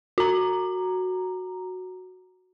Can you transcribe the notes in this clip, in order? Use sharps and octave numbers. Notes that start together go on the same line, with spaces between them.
F#4 A#5